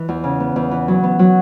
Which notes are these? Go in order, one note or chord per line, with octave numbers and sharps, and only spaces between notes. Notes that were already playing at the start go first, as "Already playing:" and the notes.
Already playing: E3
E2
C#3
B3
E2
E3
F#3
B3
F#3